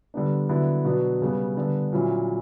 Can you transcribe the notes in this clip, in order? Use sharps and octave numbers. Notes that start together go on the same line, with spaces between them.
D3 G3 B3 D4
D3 F#3 B3 E4
B2 F#3 B3 D4
C#3 G3 B3
D3 G3 B3 D4
A#2 F#3 C#4 E4